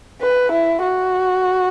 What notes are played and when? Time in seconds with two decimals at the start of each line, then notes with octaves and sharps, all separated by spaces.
0.21 B4
0.52 E4
0.82 F#4